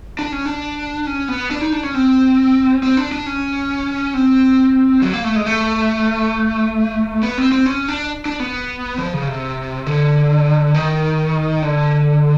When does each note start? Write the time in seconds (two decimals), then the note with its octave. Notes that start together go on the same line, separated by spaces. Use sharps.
0.19 D4
0.32 C#4
0.46 D4
1.07 C#4
1.28 B3
1.51 D4
1.61 D#4
1.72 D4
1.83 C#4
1.94 C4
2.83 C4
2.97 D4
3.12 D4
3.26 C#4
4.14 C4
5.02 F#3
5.13 A#3
5.24 A3
5.36 G#3
5.46 A3
7.23 B3
7.38 C4
7.52 C4
7.66 C#4
7.88 D4
8.25 D4
8.40 B3
8.98 F3
9.13 C#3
9.28 C3
9.86 D3
10.74 D#3
11.62 D3